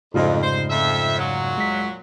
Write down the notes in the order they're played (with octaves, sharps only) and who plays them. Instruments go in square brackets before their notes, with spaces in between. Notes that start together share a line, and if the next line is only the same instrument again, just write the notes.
[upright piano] F1 F4 D#5 [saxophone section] F2 [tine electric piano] G#2 C#3
[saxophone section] C5
F2 E5
A#2 F#3
[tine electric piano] G#3 B6